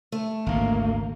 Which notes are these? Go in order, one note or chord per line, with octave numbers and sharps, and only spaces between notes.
A3 C#5
G#1 D2 B2 A#3